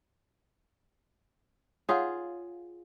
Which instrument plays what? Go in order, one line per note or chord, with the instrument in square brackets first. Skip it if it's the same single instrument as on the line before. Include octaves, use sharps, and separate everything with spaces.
[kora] F4 G#4 [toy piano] C#5 F5 F#5